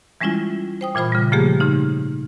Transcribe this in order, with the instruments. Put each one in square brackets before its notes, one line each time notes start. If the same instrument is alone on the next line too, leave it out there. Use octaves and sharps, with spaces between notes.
[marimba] E3 G3 G#3 C#4 E4 F4
C5 G5 D#6
A#2 E3 F4 C5 B5
C#3 G3
C#3 F3 A3 A#3 G4 G#4
G#2 C#3 D#4